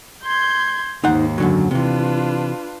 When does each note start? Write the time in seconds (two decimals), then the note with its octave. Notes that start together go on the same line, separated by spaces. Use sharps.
0.24 C6 G6 G#6
1.04 D#2 G#2 D#4 C5 F#5
1.38 F#2 D3 F#3
1.71 C3 E3 D4 F4 B4